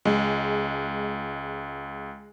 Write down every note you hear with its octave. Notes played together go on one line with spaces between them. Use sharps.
C#2 G#3